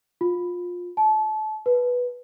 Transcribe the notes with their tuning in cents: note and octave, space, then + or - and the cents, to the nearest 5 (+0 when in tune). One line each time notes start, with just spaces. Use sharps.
F4 +20
A5 -30
B4 -10